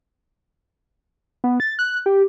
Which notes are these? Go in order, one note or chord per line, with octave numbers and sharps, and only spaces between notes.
B3
A6
F#6
G4